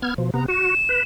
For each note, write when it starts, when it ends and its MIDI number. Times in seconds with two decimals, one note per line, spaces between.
0.02 0.14 59
0.02 0.14 89
0.02 0.14 92
0.18 0.30 47
0.18 0.30 53
0.34 0.46 48
0.34 0.46 59
0.34 0.44 82
0.48 0.75 66
0.48 1.03 100
0.89 1.03 71